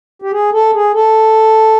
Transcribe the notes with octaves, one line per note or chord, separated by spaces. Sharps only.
G4
G#4
A4
G#4
A4